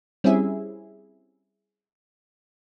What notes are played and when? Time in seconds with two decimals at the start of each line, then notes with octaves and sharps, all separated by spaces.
0.24 G3 C4 C#4 E4 G#4 E5